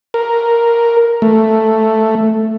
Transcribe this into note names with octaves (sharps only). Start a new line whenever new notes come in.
A#4
A3